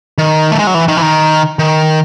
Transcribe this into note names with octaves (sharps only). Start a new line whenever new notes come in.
D#3
A3
G#3
F#3
E3
D#3
E3
D#3
D#3